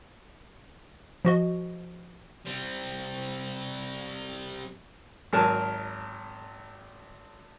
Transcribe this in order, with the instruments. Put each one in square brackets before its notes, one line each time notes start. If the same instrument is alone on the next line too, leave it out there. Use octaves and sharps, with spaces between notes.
[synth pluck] F3 F#4 D#5
[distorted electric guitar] G3 C4
[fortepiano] G#1 F#3 A#4 G#5 A5